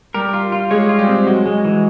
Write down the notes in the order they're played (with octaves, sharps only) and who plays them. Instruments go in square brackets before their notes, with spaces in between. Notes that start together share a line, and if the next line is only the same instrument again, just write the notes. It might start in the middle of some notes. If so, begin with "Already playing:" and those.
[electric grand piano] G3 G4 [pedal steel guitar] A#4
[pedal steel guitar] F4
F4
[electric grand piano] G#3 G#4 [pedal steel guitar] C#5
[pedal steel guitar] F4
[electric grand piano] G3 G4
[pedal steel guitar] C4
[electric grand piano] F#3 F#4 [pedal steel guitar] G#3
[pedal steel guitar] G#3
E3